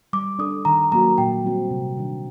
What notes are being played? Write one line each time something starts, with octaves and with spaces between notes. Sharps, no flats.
G3 D6
D4 A4 D#6
D#3 A#5
F#3 A#3 F#4 A#5
A#2 G5
G3 C4 F#4
C3
D#3 G3 D4